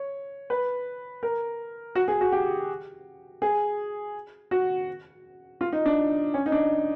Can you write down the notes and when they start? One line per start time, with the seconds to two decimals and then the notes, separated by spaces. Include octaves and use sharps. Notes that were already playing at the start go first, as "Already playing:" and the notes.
Already playing: C#5
0.50 B4
1.23 A#4
1.95 F#4
2.08 G#4
2.21 F#4
2.32 G4
3.42 G#4
4.51 F#4
5.61 F4
5.73 D#4
5.86 D4
6.34 C#4
6.46 D#4
6.52 D4